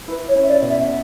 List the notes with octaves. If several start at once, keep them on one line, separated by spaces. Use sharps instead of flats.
E4 B4
C#5
C#4
E5
D5
B2
E5